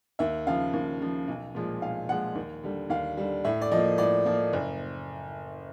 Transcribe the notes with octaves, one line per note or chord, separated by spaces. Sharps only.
D#2 E5
C#3 F3 F5
D#2
C#3 F3
B1
A#2 F3 G#3
B1 F5
A#2 F3 G#3 F#5
D#2
D3 G3
D#2 F5
D3 G3
A2 E5
D5
F3 A#3 D#5
A2 D5
F3 A#3
F#1